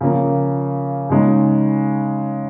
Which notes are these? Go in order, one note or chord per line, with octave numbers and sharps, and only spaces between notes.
C#3 F3 A#3
C#3 G#3 D#4